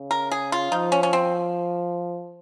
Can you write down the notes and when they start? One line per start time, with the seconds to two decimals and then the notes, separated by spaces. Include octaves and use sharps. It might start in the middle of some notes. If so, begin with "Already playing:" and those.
Already playing: C#3
0.11 A#4
0.31 G#4
0.52 F4
0.72 F3 D#4
0.92 C#4
1.03 C#4
1.13 C4